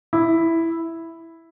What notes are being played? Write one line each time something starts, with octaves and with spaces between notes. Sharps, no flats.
E4